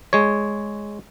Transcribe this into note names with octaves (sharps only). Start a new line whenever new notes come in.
G#3 C#5